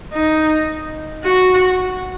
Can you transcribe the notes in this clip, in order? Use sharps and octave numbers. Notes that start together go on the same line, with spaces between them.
D#4
F#4